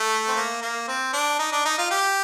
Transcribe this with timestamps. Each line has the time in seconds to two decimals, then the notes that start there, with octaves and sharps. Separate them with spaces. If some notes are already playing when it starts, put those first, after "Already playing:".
Already playing: A3
0.28 C4
0.36 A#3
0.62 A#3
0.88 C4
1.13 D4
1.39 D#4
1.52 D4
1.65 D#4
1.78 F4
1.91 G4